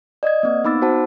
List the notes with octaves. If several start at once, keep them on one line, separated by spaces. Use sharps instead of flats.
D5 D#5 D#6 G#6
A#3 C4
B3 D#4 B5 D6 E6 A6
F#4 C5 F#5 A5